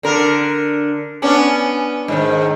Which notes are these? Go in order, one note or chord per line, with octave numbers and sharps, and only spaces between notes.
D3 A#4
B3 C#4 D4
G#2 D#3